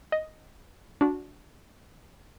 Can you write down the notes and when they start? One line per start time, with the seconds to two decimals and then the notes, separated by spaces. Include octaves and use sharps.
0.12 D#5
1.01 D4 F#4